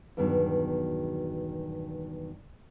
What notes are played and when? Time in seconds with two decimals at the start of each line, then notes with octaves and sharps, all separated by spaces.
0.17 E2 G2 B2 D#3 F#3